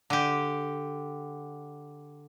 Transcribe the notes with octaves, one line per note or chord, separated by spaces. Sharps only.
D3 G4